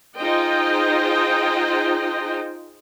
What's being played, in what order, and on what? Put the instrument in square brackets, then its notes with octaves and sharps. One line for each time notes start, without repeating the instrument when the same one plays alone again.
[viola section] D#4 F4 G#4 C5 D#5 G5